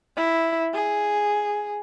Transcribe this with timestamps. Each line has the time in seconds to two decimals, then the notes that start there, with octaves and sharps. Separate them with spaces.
0.17 E4
0.74 G#4